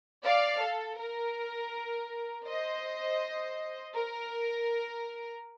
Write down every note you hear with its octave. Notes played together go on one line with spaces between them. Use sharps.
D5 F5
A4
A#4
C5 D#5
A#4